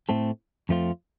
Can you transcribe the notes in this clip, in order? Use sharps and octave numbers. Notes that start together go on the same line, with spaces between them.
A2 A3 C4 A4
F2 F3 A3 C4 F4